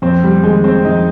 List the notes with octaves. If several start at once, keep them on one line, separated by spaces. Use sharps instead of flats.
F2 C4
G3
D#3 G#3
C4
F2 D#4